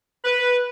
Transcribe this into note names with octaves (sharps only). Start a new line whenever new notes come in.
B4